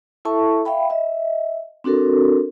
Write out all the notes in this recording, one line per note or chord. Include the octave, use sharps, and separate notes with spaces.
E4 A4 E5 A5 C#6
E5 F5 G5 B5
D#5 E5
C4 D4 F#4 A4 A#4